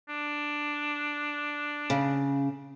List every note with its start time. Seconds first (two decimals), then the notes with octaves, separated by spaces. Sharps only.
0.09 D4
1.90 C#3